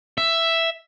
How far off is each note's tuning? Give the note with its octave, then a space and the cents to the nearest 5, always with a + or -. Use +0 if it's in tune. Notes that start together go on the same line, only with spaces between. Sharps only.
E5 +5